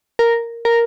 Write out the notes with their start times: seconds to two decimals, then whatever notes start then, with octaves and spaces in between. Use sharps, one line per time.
0.19 A#4
0.65 A#4